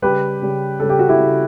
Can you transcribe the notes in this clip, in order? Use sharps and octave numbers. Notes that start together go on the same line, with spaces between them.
C#3 G3 G4 B4
C#3 G3
C#3 G3 A4
G4
F#4
E4 G4
C#3 G3